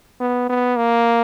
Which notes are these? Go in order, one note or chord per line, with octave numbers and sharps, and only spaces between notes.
B3
B3
A#3